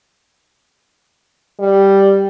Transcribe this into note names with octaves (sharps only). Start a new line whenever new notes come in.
G3